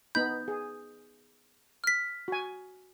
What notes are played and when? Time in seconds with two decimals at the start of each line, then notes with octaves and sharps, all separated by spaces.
0.15 B3 D#4 B5 G6
0.48 G#4
1.84 F6 B6
2.28 F#4 G#5